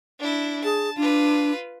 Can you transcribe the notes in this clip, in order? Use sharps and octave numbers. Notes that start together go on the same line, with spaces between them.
D4 E4
G#4 A5
D4 F4 B4